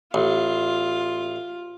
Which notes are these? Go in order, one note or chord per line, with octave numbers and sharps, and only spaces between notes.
A1 F4